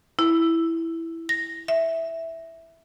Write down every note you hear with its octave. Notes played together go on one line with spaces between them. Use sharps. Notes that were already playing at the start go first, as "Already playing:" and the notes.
E4
A#6
E5